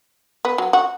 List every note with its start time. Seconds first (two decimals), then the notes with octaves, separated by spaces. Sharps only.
0.45 B3
0.58 F#3
0.73 F#4